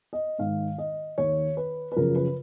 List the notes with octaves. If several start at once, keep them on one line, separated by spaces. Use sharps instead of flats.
D#5
G#2 D#3 F5
D#5
D#2 D#3 C#5
B4
B4
F#2 C#3 F3 A#4
B4